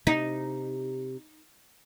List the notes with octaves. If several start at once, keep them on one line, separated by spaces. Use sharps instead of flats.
C3 D#4